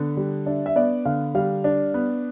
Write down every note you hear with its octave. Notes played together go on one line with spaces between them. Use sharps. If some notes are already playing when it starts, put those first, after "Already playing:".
Already playing: D3 B3
G3
D4 E5
E5
B3 D5
D3 F5
G3 F5
D4
B3